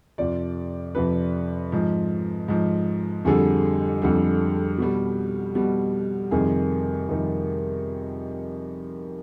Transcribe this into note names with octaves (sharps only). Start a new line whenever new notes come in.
F2 C3 F3 D5
F2 C3 F3 B4
G#2 F3
G#2 F3
F2 D3 G3 G#4
F2 D3 G3
B2 G3
B2 G3
F2 C3 D#3 G3 G#4
F2 C3 D#3 G3